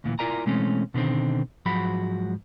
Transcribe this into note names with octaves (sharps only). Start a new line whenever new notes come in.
D2 A#2 E3
E4 F4 A#4 D5 G#5 A#5
B2 E3 G#3 A3 C4 C#4
B2 D3 D#3 C4
G#2 F3 F#3 G#3 F#4 B5